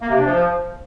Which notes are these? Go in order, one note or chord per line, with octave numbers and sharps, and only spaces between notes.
A#3
C3
D4
F3